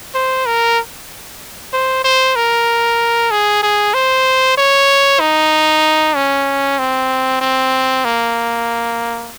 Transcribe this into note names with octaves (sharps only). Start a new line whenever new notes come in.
C5
A#4
C5
C5
A#4
G#4
G#4
C5
C#5
D#4
C#4
C4
C4
A#3